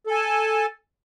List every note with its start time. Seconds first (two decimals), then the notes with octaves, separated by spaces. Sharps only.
0.07 A4
0.11 G#5
0.15 A5